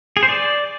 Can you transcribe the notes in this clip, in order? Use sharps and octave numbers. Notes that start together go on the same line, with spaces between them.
G#4
C5
D5